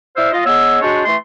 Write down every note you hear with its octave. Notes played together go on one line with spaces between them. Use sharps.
E4 C5 D5 F5 E6
F4 D#5
G#3 B3 C#5 E6
G#3 D4 F#4 C5 C#5
E3 A3 C6